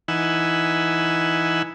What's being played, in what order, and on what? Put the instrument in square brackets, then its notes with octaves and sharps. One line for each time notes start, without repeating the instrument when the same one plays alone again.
[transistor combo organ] E3 D#4 F#5 G#5 B5 E6